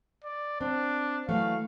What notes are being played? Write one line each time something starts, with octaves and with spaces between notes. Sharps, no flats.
D5
C4 D4
E3 F#3 A3 F5